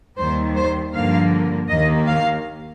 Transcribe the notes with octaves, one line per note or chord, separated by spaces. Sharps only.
D#2 D#3 G3 C5
C5
G2 D3 F3 A#3 F5
D#2 D#3 A#3 D#5
F5